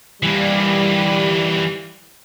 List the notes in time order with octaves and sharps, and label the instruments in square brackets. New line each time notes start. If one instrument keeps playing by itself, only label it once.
[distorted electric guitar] E3 A#3 [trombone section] G3